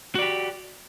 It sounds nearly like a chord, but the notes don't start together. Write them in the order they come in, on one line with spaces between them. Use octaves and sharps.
F#4 D5 G4